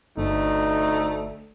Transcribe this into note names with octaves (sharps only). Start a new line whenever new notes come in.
G1 D2 A3 D#4